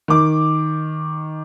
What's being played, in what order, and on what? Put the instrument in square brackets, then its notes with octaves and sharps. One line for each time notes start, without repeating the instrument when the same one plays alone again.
[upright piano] D#3 D6